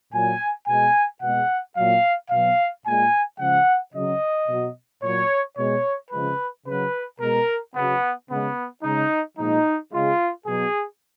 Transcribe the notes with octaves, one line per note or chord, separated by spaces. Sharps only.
A#2 F#3 G#5
B2 G#3 G#5
B2 G#3 F#5
A#2 F#3 F5
B2 F#3 F5
A#2 G#3 G#5
C#3 F3 G#3 F#5
C#3 F#3 D#5
B2 F#3
A#2 F#3 C#5
B2 G#3 C#5
C#3 F3 G#3 B4
C#3 F#3 B4
B2 G#3 A#4
C#3 F#3 B3
C#3 G#3 B3
C#3 G#3 D#4
A#2 F3 G#3 D#4
C#3 G#3 F4
B2 F#3 G#4